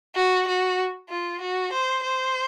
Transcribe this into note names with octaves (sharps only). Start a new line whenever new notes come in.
F#4
F#4
F4
F#4
C5
C5